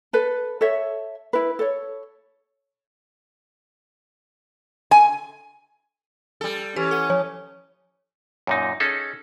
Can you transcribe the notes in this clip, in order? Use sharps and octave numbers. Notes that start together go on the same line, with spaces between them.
A4 B4
A4 C#5 E5
E4 B4
A4 C#5
G#5
G3 A4
E3 C#4 G4
A4 F#5 D#7
F3 C#5
F#2 A#2 D#4
C#4 D#4 G#4 A4